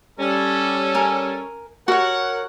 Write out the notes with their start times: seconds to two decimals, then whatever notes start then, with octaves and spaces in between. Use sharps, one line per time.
0.20 G3 C#4 A4
0.95 A#4 G#5
1.88 F#4 A#4 C#5 F#5